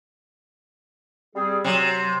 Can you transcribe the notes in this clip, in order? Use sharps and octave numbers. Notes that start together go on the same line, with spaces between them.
G3 C4 G#4
C3 F#3